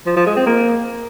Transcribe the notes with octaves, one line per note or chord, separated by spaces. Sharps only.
F3
F3
G#3
C4
A#3